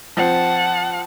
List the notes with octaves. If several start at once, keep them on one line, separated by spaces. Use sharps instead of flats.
F3 C4 F#5 A5